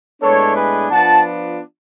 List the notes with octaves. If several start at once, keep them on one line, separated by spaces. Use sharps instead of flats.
A2 G#3 B3 D4 A4 C#5
G#4 B4
F3 B3 D4 F4 F#5 A5